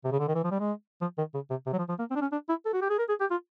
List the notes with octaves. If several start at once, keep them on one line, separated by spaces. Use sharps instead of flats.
C3
C#3
D3
D#3
E3
F3
G3
G#3
F3
D#3
C#3
C3
C3
F#3
F3
F3
A#3
C4
D4
C#4
D4
E4
A4
F#4
G4
G#4
A#4
G#4
G4
F4